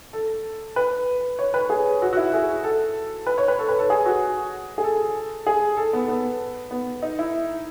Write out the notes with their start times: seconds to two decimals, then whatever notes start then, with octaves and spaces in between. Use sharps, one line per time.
0.13 A4
0.76 B4
1.39 C#5
1.54 B4
1.70 G#4
2.02 F#4
2.13 F#4
2.17 E4
2.33 G#4
2.63 A4
3.27 B4
3.38 C#5
3.48 B4
3.59 A4
3.69 B4
3.79 A4
3.90 G#4
4.06 F#4
4.78 G#4
4.84 A4
5.47 G#4
5.77 A4
5.93 B3
6.08 B3
6.71 B3
7.02 D#4
7.19 E4